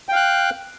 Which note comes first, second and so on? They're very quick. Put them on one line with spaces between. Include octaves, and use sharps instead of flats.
G5 F5 F#6